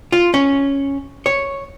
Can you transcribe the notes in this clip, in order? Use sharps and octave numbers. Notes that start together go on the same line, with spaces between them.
F4
C#4
C#5